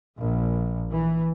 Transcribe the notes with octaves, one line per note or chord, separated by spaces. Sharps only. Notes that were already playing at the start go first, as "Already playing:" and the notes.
A#1
E3